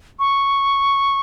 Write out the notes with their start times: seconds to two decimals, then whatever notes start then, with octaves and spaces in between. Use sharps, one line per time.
0.19 C#6